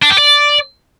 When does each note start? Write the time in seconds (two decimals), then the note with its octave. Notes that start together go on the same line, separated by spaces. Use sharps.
0.02 D4
0.10 G4
0.18 D5